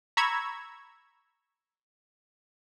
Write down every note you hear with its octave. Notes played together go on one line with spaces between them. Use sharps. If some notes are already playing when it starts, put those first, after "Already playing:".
A#5 B5 C#6 E6 G#6